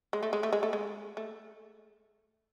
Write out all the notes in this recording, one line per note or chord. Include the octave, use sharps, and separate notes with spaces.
G#3
A3
G#3
A3
G#3
A3
G#3
A3